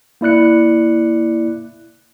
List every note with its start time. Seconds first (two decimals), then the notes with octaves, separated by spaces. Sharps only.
0.21 A#3 E4 D5 F#6 C#7